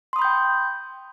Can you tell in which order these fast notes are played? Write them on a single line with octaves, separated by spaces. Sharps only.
C6 D#6 B5 G6 G5